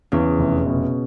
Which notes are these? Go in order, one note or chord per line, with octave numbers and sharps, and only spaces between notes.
E2 C#3
F1
B2